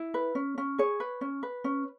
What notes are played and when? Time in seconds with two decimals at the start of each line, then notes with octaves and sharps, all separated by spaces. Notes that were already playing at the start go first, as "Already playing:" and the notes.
Already playing: E4
0.14 B4
0.35 C#4
0.58 C#4
0.78 G#4 C#5
1.00 B4
1.21 C#4
1.43 B4
1.64 C#4